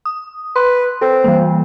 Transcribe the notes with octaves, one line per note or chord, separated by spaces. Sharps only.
D#6
B4 C6
C4 A4
E3 G3 A#3